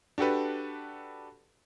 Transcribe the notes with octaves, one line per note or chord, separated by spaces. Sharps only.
D4 F#4 G4 A4 B4